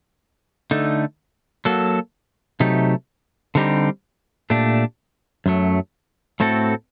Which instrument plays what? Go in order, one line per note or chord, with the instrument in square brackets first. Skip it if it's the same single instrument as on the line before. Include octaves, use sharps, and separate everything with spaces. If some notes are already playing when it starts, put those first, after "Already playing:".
[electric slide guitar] D3 A3 D#4
F#3 A#3 F#4 A4
C3 F#3 A3 D#4 G4
D3 G3 C4 D#4 G4
A#2 A3 D4 G4
F#2 F#3 A3
A2 A3 C4 F#4 A4